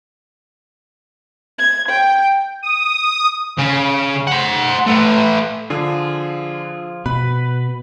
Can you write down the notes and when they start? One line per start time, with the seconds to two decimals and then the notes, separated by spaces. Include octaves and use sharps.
1.58 G#6
1.88 G5
2.63 D#6
3.58 C#3
4.27 C5 F#5
4.87 A3 B4
5.70 D3 F3 F4 G#4
7.06 B2 B4 B5